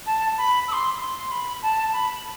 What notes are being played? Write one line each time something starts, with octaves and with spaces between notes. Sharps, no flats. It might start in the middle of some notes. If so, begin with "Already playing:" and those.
A5
B5
E6
C6
C6
C6
B5
A5
B5